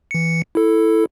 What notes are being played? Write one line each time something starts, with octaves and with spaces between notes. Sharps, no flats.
E3 C#7
E4 A4